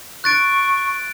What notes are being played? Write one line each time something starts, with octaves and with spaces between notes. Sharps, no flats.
C#6 F#6 A6 D7